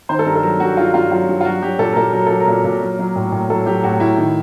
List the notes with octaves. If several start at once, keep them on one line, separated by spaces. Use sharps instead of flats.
D#3 C5
A4
G2 A#4
A4
F#3 A#4
G2 F#4
D#3 F4
G2 F4
F#3 F4
G2
F4
F#3 F#4
F#3 G4
A#2 A4
A#4
A#2 A4
F#3 A#4
F#3 A4
A#4
A#2
A#2
F#3
F#3
A2
A2
F#3 A4
F#3 G4
A2 F#4
A2 E4
D#3